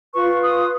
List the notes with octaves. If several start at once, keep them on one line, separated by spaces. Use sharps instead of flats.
F4 B4 C#6
D#6